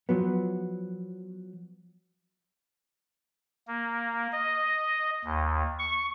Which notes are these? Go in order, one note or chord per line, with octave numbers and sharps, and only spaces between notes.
F3 F#3 B3
A#3
D#5
D#2
C#6